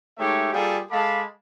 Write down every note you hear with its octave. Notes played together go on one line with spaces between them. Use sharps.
G#3 A3 D#4 G4 C#5 E5
G3 A#3 F4 G#4 A4 G5
G#3 A4 F5 A5 B5 D6